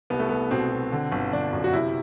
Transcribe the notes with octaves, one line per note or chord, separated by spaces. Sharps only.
C2 B3
A3
C2 B3
B2 C4
B2
D3
G1
G1 D4
F#2
F#4
C3 E4